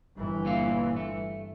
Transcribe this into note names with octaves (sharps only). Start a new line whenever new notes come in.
G1 E3
A#2 A3 F5
A3